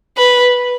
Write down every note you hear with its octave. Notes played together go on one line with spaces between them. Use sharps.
B4